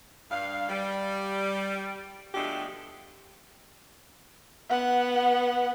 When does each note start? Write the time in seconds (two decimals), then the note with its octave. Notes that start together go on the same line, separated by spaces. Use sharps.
0.31 G2 F5
0.69 G3
2.35 B2 F3 G#3 A3 D4 G4
4.70 B3 F#5